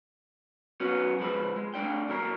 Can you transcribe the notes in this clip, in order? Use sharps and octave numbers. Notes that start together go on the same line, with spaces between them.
F#3 B3 C#4 F#4 F#5
F3 G#3 B4 C5
G#3
A3 D4 D5 G5
B1 F#3 A#3 D#5 A#5